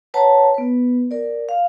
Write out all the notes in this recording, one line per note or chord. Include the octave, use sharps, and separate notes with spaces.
B4 C#5 F#5 A5 A#5
B3 B4
A#4 D5
F5